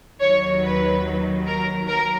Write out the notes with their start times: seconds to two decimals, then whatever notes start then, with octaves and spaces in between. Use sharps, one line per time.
0.20 D#2 D#3 F#3 C#5
0.62 B4
1.46 A#4
1.87 F#3 A#4